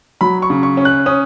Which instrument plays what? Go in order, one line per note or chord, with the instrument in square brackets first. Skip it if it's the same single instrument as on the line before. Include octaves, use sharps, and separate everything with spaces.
[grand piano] F#3 B5
C#6
C#3
C#6
C#4
F#6
C#4 D#6